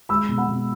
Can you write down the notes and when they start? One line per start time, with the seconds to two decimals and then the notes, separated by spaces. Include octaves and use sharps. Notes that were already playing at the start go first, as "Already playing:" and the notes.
0.09 G#3 B5 E6
0.29 B2
0.38 F#5 B5
0.47 B2